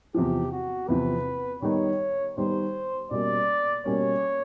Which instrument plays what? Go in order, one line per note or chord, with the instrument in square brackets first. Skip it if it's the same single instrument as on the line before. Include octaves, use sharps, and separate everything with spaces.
[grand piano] E2 C3 F3 [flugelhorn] G4
[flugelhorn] F#4
[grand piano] E2 C3 F3 [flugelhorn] B4
[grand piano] D#3 G3 B3 D#4 [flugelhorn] C#5
[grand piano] D#3 G3 B3 D#4 [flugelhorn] C5
[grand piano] B2 G3 A#3 C#4 [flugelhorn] D5
[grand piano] B2 G3 A#3 C#4 [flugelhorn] C#5